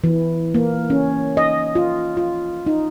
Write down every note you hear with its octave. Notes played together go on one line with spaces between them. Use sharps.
E3
A#3
C#4
D#5
F4
F4
D#4